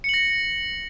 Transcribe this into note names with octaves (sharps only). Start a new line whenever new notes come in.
A#6 C#7 F#7